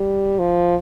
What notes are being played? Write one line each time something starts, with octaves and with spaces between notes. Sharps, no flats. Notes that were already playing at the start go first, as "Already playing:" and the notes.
Already playing: G3
F3